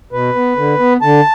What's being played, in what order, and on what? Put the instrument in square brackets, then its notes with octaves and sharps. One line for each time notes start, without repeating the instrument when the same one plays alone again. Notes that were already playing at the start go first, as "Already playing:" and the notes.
[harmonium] B2 B4
B3
D3
B3
D3 A5